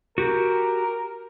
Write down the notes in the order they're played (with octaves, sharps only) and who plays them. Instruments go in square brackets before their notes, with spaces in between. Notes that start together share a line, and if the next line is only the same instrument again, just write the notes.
[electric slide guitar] F#4 G4 [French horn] A#4